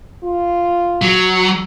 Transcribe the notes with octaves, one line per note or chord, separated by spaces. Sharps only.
F4
F#3